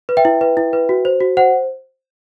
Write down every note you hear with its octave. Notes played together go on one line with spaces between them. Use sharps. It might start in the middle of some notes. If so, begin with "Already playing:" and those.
B4
E5 G5
E4
B4
E4
B4
F#4
C5
F#4
C5 F#5